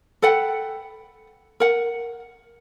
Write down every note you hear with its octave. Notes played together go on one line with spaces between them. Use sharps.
A4 B4 F#5 G5
A#4 F#5